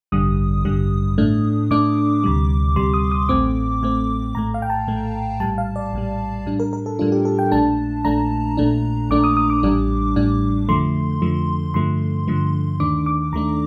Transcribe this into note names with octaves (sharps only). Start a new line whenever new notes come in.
A1 G2 D3 G3 D#6
A1 G2 D3 G3
A2 A3 D4
A2 A3 D4 D6
D2 C3 G3
D2 C3 G3 C6
D#6
D#6
A1 A2 A3 C4 D6
A1 A2 A3 C4
A#1 A2 A3 A#5
F5
G5
A5
A#1 A2 A3
A#1 A2 G3 A5
F5
D5
A#1 A2 G3
A2 G3 D4
A#4
A#4
A4
A2 G3 D4 F4
G4
A4
G5
A#1 A#2 A3 D4 A5
A#1 A#2 A3 D4 A#5
A#1 A#2 A3 D4
A#1 A#2 A3 D4 D6
D#6
D#6
D6
A1 A2 G3 D4
A1 A2 G3 D4
F2 D3 F3 A3 C6
F2 D3 F3 A3
G2 D3 F3 A3 C6
G2 D3 F3 A3
D#2 D#3 A3 D4 D6
D6
D#2 D#3 A3 D4 A#5